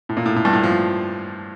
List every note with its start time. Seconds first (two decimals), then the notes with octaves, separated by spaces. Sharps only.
0.09 A2
0.17 A#2
0.26 A2
0.36 A2
0.45 G2
0.53 A2
0.63 F3